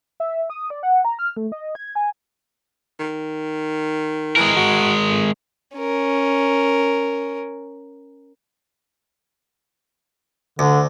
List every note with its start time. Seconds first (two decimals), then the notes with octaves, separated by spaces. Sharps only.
0.20 E5
0.50 D#6
0.70 D5
0.83 F#5
1.05 A#5
1.19 F6
1.37 A3
1.52 D#5
1.75 G#6
1.95 G#5
3.00 D#3
4.36 E3 G#3 A#4
4.56 F#4
5.09 F2
5.77 C#4 A#4
10.59 D2 D3